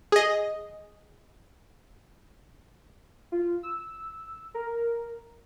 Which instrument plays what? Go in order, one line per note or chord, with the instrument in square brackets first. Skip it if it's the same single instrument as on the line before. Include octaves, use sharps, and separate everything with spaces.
[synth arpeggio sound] G#4 D#5
[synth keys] F4
E6
A#4